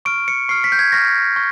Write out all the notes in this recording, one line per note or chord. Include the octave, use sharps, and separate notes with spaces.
C#6 F6 D7
C#7
C#6 F6 C7
B6
G6
G#6
C#6 F6 A#6
C#6